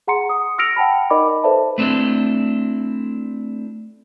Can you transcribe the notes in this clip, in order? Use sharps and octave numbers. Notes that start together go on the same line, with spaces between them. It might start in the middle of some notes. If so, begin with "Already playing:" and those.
G#4 F#5 A#5 C6 C#7
D#6
E6 F6 A#6 C#7 D7 F7
F#5 G5 A5 B5
D#4 A#4 D5 D#5 B5 D6
A4 B4 C5 D5 E5 A5
A3 C4 D4 E4 A4